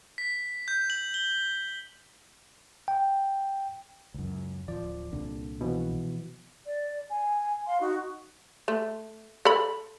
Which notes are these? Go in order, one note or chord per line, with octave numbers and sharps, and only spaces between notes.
B6
G6
F#7
G7
G5
C#2 F#2
D1 F3 D5
C2 A#2 D3
B2 E3 F3
D5
G#5
F5 C6
D#4 F#4
A3
A4 B5